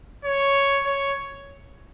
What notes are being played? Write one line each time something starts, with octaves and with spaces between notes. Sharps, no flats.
C#5
C#5